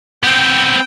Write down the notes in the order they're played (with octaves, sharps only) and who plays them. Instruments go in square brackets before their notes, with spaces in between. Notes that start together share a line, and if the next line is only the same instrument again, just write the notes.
[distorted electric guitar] B3 C4 [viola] G5